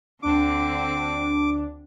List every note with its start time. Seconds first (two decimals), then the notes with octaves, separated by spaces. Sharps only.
0.23 D2 D3 C4 D4 D6